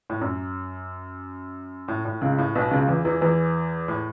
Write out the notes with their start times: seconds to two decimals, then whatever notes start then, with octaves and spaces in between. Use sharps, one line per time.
0.10 A2
0.21 F#2
1.88 A2
2.05 A2
2.21 C#2 C#3
2.38 A2
2.55 B1 B2
2.71 C#2 C#3
2.88 E2 E3
3.05 E2 E3
3.21 E2 E3
3.88 A2